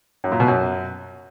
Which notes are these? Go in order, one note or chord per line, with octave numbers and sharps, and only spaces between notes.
F#2
A#2
B2
F#2